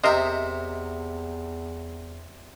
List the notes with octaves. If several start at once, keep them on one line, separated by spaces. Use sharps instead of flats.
E2 C3 A#4 C5 D#5 E5